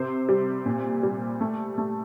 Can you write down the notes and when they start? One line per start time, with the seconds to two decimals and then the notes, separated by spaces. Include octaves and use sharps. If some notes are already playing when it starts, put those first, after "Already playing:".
Already playing: C3 C5
0.29 G3
0.66 A#2
1.03 G3
1.41 A3
1.78 A3